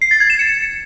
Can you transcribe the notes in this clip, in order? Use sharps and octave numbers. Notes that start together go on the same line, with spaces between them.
C7
A6
G#6
E7
C#7